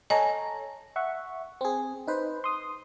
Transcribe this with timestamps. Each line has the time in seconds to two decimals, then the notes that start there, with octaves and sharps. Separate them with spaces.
0.10 A4 C#5 D#5 G#5 A#5
0.96 E5 F#5 C#6
1.61 C4 G#4
2.07 D#4 B4 C5
2.44 C6 D#6